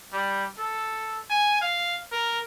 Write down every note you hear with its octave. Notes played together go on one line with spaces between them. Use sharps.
G3
A4
G#5
F5
A#4